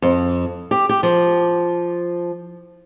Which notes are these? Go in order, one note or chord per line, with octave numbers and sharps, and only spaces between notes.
F2
G4
G4
F3